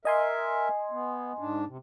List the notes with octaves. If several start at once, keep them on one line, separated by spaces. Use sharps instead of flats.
A#4 D#5 E5 G#5 C6
B3
G#2 D4
C3